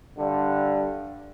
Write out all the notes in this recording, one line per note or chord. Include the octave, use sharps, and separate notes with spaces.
G2 D3